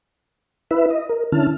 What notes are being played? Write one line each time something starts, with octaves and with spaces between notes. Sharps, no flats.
E4 B4 E5
D#5
A#4
D3 C#4 E4 A5 F6